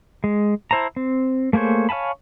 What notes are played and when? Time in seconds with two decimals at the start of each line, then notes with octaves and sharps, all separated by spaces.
0.24 G#3
0.71 E4 C5 A5 A#5
0.96 C4
1.53 A3 A#3 G#4 C5 C#5
1.89 C#5 F5 G#5 A5 B5